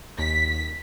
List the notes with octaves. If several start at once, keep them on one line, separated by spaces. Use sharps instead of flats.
D#2 B6